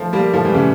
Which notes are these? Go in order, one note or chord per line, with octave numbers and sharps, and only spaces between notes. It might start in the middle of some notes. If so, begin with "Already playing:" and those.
Already playing: F3 A3
G3 A#3
F3 A3
E3 G3
A2 C#3